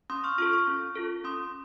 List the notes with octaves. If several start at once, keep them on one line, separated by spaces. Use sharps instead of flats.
C#4 C6 D#6
C#6 F6
F4 A4 C#6 F6
C#6 F6
C#4
F4 A4
C#4 C6 D#6